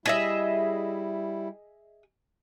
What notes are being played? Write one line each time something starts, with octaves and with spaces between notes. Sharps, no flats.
G3 E4 G#4 D#5 E5